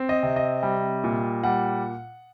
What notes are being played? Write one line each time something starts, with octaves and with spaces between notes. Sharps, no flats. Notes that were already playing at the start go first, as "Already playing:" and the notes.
Already playing: C4
D#5
C3
D#5
G3
A#2
G3 F#5